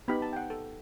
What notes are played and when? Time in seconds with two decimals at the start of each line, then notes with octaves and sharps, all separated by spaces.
0.08 B3 D#4 G4 B5
0.22 A5
0.33 G5
0.37 F#5
0.50 A4